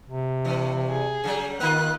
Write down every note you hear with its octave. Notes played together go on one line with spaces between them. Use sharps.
C3
G2 E3
G#4
C#3 F#3 G3
D#3 A#3 D#4 F4 F#6